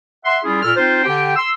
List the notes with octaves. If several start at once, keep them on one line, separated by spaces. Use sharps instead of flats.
E5 F#5 C6
G3 C#4 E4 F4 G#4
A#2 A4 F6
C4 D#4 F4 C5
D3 G4 G5
C6 E6